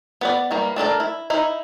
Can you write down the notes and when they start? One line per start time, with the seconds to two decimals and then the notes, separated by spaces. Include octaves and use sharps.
0.21 B3 B4 D5
0.51 E3 G3 A#3
0.76 A3 D4 A4 A#4
1.00 E4
1.30 D#4 E4